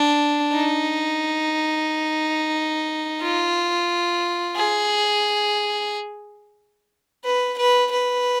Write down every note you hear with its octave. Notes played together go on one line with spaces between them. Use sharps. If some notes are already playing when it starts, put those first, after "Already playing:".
Already playing: D4
D#4
F4
G#4
B4
B4
B4